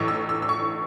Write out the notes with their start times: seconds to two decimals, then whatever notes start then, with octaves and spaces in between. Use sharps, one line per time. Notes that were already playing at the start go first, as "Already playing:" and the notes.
Already playing: A1 A2 E3 C#6
0.08 E6
0.29 E6
0.42 E6
0.49 C#6